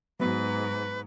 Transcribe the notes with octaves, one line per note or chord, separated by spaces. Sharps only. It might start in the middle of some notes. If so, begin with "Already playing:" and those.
G#2 F#3 B3 B4